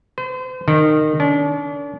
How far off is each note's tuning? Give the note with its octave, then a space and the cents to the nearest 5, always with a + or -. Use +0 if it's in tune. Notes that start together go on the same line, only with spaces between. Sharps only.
C5 -40
D#3 -20
D4 -40